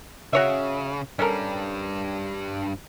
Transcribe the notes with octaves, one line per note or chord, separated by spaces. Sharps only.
C#3 F#4 C#5 E5
G2 G3 C#4 A4 A#4